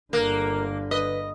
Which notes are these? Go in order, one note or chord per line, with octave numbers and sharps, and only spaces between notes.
G1 D3 A#3 A#4 F#6
B4 D#5